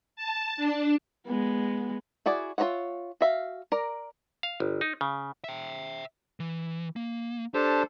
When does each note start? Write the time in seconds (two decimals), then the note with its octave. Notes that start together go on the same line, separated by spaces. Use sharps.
0.16 A5
0.57 D4
1.27 G#3 B3
2.26 E4 F#4 G#4 D5
2.58 F4 A#4 C#5 E5 F#5
3.21 F#4 E5 F5
3.72 A#4 D5 A#5
4.43 F5
4.60 G1
4.81 D#4
5.01 C#3
5.44 E5 G5
6.40 E3
6.96 A#3
7.54 D4 G4 A4 C5